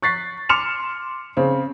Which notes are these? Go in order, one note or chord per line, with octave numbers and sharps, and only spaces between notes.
C#6 F#6 A6 B6 C7
C6 D6 F6 C#7 E7 F7
C#3 C4